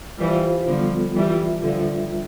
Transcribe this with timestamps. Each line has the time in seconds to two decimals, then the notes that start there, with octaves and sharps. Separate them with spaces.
0.19 E3 G3 F4 C5 F5
0.67 D3 F3 G3 B3 F4 A4
1.15 E3 G3 F4 B4 E5
1.63 D3 F3 G3 D4 F4 B4 E5